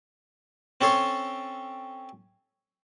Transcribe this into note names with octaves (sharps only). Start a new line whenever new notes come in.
C4 C#4 A4 C#5 C6